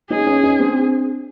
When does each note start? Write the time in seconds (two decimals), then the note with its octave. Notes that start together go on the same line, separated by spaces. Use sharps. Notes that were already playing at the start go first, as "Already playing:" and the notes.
0.10 C#4 D#4 G#4
0.27 C#4 D#4
0.43 C#4 D#4
0.59 C4 D4